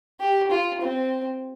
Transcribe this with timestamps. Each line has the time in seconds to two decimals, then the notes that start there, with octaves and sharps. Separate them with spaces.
0.21 G4
0.51 F4
0.82 C4